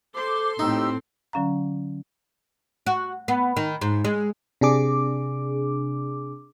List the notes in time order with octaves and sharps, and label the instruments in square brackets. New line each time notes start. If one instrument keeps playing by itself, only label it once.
[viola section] A4 C6 [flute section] C5 D6
[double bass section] A2 C4 [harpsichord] D#4 [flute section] G4 E6
[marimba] D3 F#3 C#4 F5 A#5
[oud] F#4
B3
D#3
G#2
G#3
[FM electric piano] C3 D4 G#4 D6